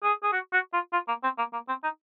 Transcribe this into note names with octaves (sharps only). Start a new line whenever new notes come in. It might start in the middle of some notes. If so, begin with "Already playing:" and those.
G#4
G#4
F#4
F#4
F4
F4
A#3
C4
A#3
A#3
C4
D#4